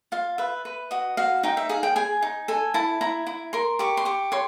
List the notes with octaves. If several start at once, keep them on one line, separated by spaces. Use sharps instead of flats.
F4 F5
B4 E5
B4
F#4 D#5
F#4 F5
D#4 G5
E5
G#4 F5
G5
G#4 G#5
D#4
A4 G#5
E4 A5
E4 A#5
E4
A#4 C6
G4 C#6
C6
G4 C#6
C#5 C6